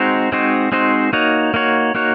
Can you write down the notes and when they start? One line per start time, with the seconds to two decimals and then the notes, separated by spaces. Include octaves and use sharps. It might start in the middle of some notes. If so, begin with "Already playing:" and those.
Already playing: G#3 C4 D#4 F#4 C5
0.32 G#3 C4 D#4 F#4 C5
0.72 G#3 C4 D#4 F#4 C5
1.13 A#3 D#4 F#4 C#5
1.54 A#3 D#4 F#4 C#5
1.95 A#3 D#4 F#4 C#5